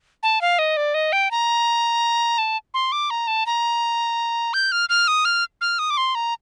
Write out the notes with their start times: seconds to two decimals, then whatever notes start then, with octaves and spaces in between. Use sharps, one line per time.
0.23 A5
0.41 F5
0.59 D#5
0.77 D5
0.94 D#5
1.13 G5
1.31 A#5
2.38 A5
2.74 C6
2.92 D6
3.10 A#5
3.28 A5
3.46 A#5
4.54 G6
4.72 F6
4.89 F6
5.08 D#6
5.25 F6
5.61 F6
5.79 D#6
5.90 D6
5.97 C6
6.15 A#5